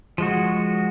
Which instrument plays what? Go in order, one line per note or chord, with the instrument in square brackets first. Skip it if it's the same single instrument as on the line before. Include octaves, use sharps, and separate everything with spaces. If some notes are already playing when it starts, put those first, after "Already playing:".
[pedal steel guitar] F3 G#3 F#4